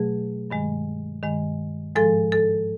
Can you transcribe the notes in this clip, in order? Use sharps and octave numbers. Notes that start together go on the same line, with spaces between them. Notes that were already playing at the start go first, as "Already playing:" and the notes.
Already playing: B2 F#3 A3 G#4
G2 D#3 G#3
G2 D#3 G#3
G#2 F3 G#3 A4
A4